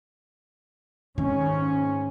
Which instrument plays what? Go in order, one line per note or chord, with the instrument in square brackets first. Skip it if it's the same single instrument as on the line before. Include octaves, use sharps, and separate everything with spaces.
[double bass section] G#2 C#4 [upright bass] D#3